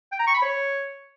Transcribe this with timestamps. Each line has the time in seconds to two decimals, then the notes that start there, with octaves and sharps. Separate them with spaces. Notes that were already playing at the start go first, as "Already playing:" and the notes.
0.12 G5
0.20 A#5
0.27 C#6
0.35 B5
0.42 C#5